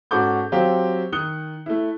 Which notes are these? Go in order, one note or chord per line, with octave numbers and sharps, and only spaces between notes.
G#2 C#4 F#4 A4 D6 G6
F#3 C4 F4 G4
D#3 D#6 F#6 C#7 G7
A3 E4